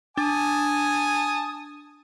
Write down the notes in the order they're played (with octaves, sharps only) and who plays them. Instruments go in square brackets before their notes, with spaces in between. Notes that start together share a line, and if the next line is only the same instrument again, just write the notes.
[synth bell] D4 [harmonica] G#5 A5 D#6